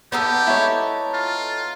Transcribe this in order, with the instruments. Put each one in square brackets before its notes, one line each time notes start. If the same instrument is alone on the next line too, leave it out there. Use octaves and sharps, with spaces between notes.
[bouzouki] B3 D#4 A4 [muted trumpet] G4
[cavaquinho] E4 C#5
[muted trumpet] F4